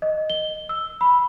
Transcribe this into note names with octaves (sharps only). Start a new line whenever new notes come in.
D#5
G7
E6
B5